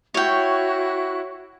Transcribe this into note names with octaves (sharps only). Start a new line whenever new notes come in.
E4 F#4 C#5 G5 F#6